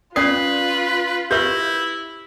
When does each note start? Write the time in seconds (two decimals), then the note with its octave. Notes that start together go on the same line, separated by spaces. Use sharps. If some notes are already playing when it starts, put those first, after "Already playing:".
0.16 C#4 F4 B4 D5 D#6 C7
1.31 E4 G4 B4 E5 G6